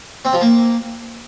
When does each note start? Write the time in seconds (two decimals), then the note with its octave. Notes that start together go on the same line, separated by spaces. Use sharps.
0.25 C4
0.33 F3
0.41 A#3